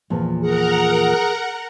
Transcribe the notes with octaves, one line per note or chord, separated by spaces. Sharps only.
E2 A#2 F3
G#4 A#4 F#5 A#5